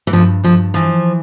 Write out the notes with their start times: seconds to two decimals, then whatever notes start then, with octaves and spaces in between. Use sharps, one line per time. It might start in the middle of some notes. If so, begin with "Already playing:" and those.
0.07 E3
0.13 G2 F3
0.43 G2 F3
0.74 E3 F3